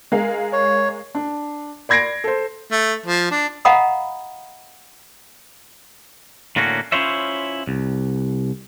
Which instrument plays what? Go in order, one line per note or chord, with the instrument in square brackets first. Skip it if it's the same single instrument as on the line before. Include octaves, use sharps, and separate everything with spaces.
[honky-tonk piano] G#3 A#4 F5
[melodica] C#5
[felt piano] D4
D5 B5 G#6 A#6 C7 D7
A4 C5
[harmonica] A3
F3
D4
[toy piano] D#5 F5 F#5 A#5 B5 D#6
[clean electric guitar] A2 D3 A#3 C#4 F#4
C#4 E4 F4 C5 C#5 E5
C2